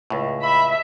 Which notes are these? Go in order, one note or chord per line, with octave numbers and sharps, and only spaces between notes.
C#2 A2
E5 B5